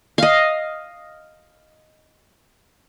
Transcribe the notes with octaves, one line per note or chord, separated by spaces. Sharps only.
D#5 F5